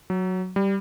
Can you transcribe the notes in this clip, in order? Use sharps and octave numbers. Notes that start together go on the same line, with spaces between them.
F#3
G3